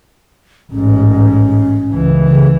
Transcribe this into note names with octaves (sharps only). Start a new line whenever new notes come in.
A1 G#2 C#4
C#2 E3
C#3